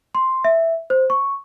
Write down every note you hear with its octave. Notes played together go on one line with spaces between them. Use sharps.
C6
E5
C5
C#6